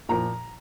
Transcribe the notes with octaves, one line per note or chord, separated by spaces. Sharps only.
A#2 F3 A#5